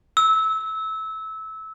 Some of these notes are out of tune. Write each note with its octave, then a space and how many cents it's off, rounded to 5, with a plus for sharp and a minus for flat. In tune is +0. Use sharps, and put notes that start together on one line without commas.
E6 -20